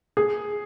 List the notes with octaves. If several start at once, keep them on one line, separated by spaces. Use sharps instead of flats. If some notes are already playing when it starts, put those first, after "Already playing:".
G#4